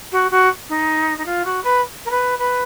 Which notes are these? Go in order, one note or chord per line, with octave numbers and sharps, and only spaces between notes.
F#4
F#4
D#4
D#4
F4
F#4
B4
A#4
B4
B4